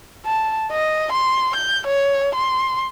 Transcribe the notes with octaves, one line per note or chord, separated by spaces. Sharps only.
A5
D#5
C6
G6
C#5
C6